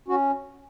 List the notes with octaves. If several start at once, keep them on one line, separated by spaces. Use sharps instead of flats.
C#4 F#4